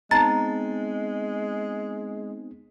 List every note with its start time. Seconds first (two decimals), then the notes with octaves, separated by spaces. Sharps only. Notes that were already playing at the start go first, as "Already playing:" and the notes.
0.11 G#3 B3 C4 D#4 A5 A#5